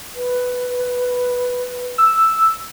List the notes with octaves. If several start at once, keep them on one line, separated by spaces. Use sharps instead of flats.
B4
E6